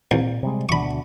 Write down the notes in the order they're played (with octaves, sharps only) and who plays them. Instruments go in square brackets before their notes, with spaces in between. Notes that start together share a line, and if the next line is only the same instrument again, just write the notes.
[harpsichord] C2 [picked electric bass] A#2
[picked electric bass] C3 G3 G#3
[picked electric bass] D2 B2 D4 [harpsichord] B5 C#6